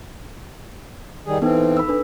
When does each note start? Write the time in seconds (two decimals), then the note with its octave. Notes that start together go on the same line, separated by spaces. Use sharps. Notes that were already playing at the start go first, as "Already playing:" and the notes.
1.27 D#3 G3 G#4
1.42 E3 B3 C4 D#4 A4
1.77 B5 E6
1.88 D4 A4 B4